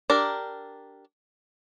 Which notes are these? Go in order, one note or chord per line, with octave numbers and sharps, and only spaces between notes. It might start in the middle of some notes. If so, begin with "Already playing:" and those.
D4 G4 A#4